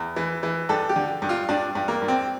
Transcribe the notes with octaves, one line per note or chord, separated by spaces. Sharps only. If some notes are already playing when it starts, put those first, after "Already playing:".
Already playing: E2
E3
E3
G2 A4
G4
D3
G2
F4
G2 D4
G2
A#3
G2
C4